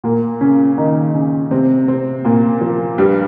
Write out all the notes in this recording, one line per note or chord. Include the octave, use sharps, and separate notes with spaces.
A#2 A#3
C#3 C#4
D#3 D#4
C#3 C#4
C3 C4
C3 C4
A#2 A#3
F3
G2 G3